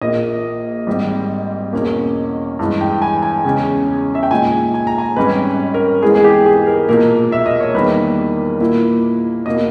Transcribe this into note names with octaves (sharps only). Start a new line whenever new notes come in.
A#1 A#2 A#3 D#5
G#1 G#2 G3
E2 B2 A#3 C#4
G2 E3 G#3
G5
G#5
G#5
E2 C#3 G#3 C#4
E5
G5
A#2 G#3 D#4 G#5
G#5
A#5
G#5
G#1 G#2 G3 C#4 B4
A#4
G#2 E3 G#3 B3 D#4 G#4
G#4
G4
G#4
A#4
B1 A#2 A#3 A#4
E5
D#5
C#5
E2 D#3 G3 A#3 D#4 B4
A#2 A#3 E4
B2 A#3 D#5